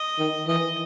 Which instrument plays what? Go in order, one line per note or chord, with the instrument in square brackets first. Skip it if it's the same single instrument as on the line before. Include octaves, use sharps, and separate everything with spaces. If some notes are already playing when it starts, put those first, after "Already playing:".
Already playing: [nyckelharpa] D#5
[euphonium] D#3
[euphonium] E3 [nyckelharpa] D#5